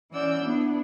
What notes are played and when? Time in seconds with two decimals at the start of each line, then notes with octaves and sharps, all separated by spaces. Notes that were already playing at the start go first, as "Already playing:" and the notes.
0.11 E3 C#4 D5 F#5 E6 G6
0.42 B3 D4 E4